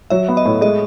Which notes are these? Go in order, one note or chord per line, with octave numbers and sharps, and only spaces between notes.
F#3 E5
B3
D#5
A2
G#3 D#5